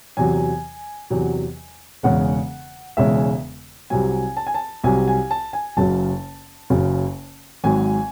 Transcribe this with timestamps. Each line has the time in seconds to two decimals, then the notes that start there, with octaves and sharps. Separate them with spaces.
0.17 E2 C3 F#3 G#5
1.10 E2 C3 F#3
2.03 E1 E2 C#3 G#3 F#5
2.97 E1 E2 C#3 G#3 E5
3.90 C2 C3 F#3 G#5
4.37 A5
4.47 G#5
4.54 A5
4.84 C2 C3 F#3 G#5
5.08 G#5
5.31 A5
5.53 G#5
5.77 F#1 F#2 C#3 F#3 A5
6.70 F#1 F#2 C#3 F#3
7.64 G#1 G#2 F#3 G#5